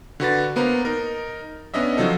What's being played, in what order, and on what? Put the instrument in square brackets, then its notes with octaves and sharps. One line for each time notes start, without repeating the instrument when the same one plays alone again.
[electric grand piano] D3 F#4 B4 A6
A#3 B3 B4 C5 A#5
D#4 A#4
B3 C#4 D4 D#5 E5
F3 F#3 C4 D#4 A4